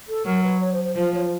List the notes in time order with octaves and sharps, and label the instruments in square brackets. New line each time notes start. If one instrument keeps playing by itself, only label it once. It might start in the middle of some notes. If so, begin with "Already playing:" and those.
[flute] A4
[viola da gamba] F#3 [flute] A#4
[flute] B4
C#5
C5
C5
[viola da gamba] F3 [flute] C5
[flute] C#5
C5